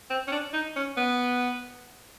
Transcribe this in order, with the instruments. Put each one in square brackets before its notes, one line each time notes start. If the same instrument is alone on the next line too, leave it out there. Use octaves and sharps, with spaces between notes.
[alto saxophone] C4
C#4
D4
D#4
C#4
B3